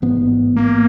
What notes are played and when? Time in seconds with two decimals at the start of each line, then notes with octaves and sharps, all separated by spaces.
0.02 A1 G#2 B3
0.56 A#3